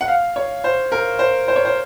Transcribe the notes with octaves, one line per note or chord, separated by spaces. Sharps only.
F#5
F5
C#5
C5
A#4
C5
C5
C#5
C5